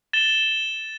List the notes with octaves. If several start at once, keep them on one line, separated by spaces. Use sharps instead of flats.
A6 E7 G7